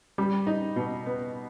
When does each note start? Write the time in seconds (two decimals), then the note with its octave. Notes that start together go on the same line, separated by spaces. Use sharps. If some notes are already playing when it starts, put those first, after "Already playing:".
0.18 G3
0.47 D#4
0.76 B2
1.06 B3